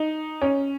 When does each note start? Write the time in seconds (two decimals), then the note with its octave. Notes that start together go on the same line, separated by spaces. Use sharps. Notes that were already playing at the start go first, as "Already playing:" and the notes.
Already playing: D#4
0.42 C#4